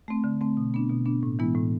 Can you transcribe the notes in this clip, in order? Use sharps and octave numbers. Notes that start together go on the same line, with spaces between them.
A3 C4
D3
A3 C4
B2
B3 D4
B2
B3 D4
A2
E3 G#3 B3 E4
A2